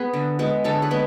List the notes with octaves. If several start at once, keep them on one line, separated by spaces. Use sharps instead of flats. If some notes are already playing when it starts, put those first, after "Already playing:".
Already playing: B3 G#4 B4
D3
G#3 B3
D3 A4 C#5
G#4 B4
G#3 B3